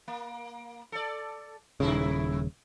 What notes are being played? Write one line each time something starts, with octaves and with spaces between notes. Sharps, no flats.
A#3
A4 D5
D#1 G2 C#3 E4 A4